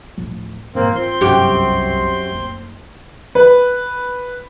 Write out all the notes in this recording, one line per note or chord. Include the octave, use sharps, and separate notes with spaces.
D1 F3
G#2 E3 A#3 C4
C4 F4 C6
G1 C2 F#2 G4
F#1 D2
B4